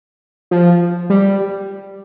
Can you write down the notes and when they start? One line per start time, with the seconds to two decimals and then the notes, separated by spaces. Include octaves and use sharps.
0.51 F3
1.10 G3